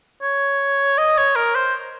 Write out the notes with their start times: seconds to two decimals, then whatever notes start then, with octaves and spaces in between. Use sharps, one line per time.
0.22 C#5
0.98 D#5
1.17 C#5
1.36 A#4
1.55 C5